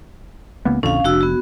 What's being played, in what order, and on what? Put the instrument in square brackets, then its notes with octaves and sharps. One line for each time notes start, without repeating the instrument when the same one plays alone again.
[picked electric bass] C#2 A#3 B3
[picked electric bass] A#1 F2 D3 [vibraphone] C#4 F5
[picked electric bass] F1 [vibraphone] D4 F#4 E6
[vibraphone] B3 F#4